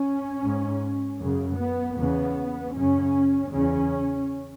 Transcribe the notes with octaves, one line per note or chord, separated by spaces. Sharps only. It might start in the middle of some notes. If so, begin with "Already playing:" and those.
Already playing: C#4
G#2
F#2 C#3
B3
E2 C#3 B3
F#2 C#3 C#4
E2 C#3 C#4